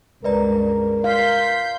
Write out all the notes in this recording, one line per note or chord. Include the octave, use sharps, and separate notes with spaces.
C#2 G2 A#4 B4 D5 A#5
F5 C6 G6 B6